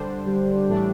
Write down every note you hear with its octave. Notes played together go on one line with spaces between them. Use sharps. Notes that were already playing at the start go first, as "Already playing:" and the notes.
Already playing: D3 G3 D4 C5
G3
A2 E3 A3 D4